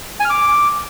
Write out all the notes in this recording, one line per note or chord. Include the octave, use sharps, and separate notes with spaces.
G#5
F6
D6